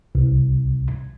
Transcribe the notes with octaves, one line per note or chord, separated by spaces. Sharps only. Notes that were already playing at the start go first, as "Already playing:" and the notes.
C2